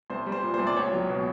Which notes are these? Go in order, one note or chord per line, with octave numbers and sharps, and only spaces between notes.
C2 C5
G3
C5
A#2
C5
C2
D5
C#2 C#5
F#3
B2